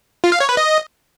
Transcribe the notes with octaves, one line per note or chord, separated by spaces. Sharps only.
F4
F5
C#5
B4
D#5